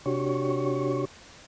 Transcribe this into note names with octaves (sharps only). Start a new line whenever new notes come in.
C3 D4 F#4 G4 C#5 C#6